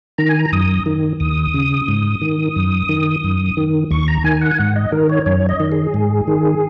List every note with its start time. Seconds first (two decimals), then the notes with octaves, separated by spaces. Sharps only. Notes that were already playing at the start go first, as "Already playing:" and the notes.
0.18 D#3 A#5
0.29 G#5
0.39 A#5
0.52 F#2 D#6
0.86 D#3
1.20 D#2 D#6
1.54 C#3
1.88 G#2
2.21 D#3
2.56 F#2
2.89 D#3
3.24 F#2
3.57 D#3
3.91 D#2 C#6
4.08 A#5
4.24 D#3 G#5
4.41 F#5
4.51 G#5
4.59 G#2 F#5
4.76 D#5
4.92 D#3 A#4
5.09 C#5
5.26 F#2 C#5
5.49 D#5
5.60 D#3
5.72 G#4
5.94 G#2
6.27 D#3